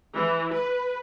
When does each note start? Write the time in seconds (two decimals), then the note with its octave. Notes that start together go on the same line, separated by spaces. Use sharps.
0.15 E3
0.53 B4